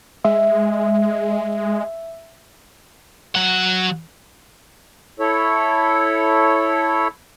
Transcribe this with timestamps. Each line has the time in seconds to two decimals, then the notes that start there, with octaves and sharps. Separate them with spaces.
0.24 G#3 E5
3.35 F#3 F#5
5.20 E4 A4 C#5